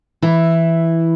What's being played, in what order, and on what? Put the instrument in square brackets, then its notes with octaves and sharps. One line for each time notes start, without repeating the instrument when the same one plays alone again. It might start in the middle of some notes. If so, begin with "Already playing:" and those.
[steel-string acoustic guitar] E3 E4